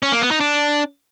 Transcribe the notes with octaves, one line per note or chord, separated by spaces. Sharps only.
C#4
A#3
B3
D#4
D4